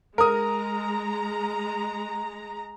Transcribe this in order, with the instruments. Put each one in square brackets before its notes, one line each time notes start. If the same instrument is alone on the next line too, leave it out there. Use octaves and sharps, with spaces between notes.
[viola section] G#3 A#5 [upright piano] A#4 D#6